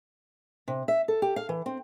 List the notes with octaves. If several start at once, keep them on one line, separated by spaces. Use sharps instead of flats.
C3
E5
A4
G4
F5
E3
C4